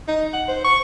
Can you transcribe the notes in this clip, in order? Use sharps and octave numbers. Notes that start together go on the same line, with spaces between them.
D#4
F#5
C5
C#6